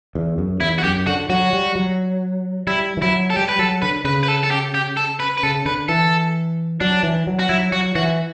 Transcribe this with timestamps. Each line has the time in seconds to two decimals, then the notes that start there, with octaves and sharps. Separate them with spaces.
0.15 E2
0.38 F#2
0.60 E2 E4
0.78 F#4
0.84 F#2 G4
1.07 D3 F#4
1.29 F#3 F#4
1.53 G3
1.75 F#3
2.67 G3 E4
2.97 E3
3.02 F#3 E4
3.30 A4
3.36 G3 G4
3.49 B4
3.59 F#3 A4
3.82 D3 B4
4.04 C#3 B4
4.23 B4
4.28 A4
4.43 A4
4.51 G4
4.74 G4
4.97 A4
5.20 B4
5.38 B4
5.43 C#3 A4
5.65 D3 B4
5.89 E3 A4
6.81 F#3 D4
7.03 E3
7.27 F#3
7.39 F#4
7.49 F#3 E4
7.72 F#3 F#4
7.95 E3 F#4